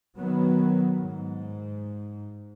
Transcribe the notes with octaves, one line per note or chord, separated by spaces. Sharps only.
D#3 F#3 B3
G#2